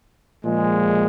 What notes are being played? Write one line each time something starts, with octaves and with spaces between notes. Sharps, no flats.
A#2 F3 G#3